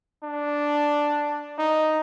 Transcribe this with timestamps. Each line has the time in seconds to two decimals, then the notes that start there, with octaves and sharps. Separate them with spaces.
0.23 D4
1.58 D#4